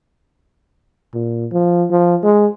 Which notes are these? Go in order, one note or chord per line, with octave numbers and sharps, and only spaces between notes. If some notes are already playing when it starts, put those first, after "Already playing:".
A#2
F3
F3
G#3